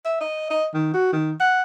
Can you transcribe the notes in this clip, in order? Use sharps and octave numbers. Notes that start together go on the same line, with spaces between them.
E5
D#5
D#5
D#3
F#4
D#3
F#5